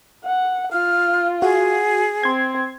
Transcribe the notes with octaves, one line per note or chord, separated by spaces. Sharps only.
F#5
F4 F6
F#4 G#4
C4 C6 G#6